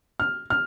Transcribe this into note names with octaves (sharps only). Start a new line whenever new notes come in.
F6
F6